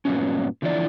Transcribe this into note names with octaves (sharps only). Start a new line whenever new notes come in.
G2 A#2 E3 F#3 B3 C#4
D3 E3 F3 E4 D5